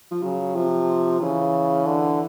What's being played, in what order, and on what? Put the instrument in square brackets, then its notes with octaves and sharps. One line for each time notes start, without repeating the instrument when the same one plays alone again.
[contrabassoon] F3
[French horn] C#3 [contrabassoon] F#3
[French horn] C3 [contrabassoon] F3
[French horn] C#3 [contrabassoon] E3
[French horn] D3